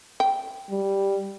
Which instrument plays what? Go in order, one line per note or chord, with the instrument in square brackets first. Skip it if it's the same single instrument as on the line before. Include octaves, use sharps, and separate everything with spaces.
[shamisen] G5
[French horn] G3